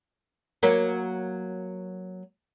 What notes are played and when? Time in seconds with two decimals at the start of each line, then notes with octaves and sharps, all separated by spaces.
0.63 F#3 A#3